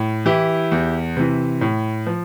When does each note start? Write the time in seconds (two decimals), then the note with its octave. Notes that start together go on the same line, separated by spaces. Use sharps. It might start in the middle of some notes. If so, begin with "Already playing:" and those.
Already playing: A2
0.26 E3 E4 G4
0.72 E2
1.17 C3 E3
1.61 A2
2.07 F3